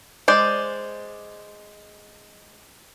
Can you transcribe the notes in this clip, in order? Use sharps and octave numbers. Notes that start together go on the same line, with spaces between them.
G#3 C5 D5